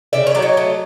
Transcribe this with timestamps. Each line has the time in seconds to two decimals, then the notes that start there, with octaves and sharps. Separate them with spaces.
0.13 C#3 D5 E5
0.27 C#5
0.35 F#3 D5
0.42 C#5 D#5
0.57 A3